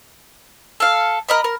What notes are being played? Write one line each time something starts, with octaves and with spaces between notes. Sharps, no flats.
A4 F5
A#4 D#5 B5
A#4